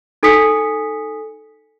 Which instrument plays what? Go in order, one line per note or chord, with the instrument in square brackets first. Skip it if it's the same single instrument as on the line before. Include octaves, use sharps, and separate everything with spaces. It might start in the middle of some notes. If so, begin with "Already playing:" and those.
[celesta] D#4 A4 G#5 D#6 B6 C#7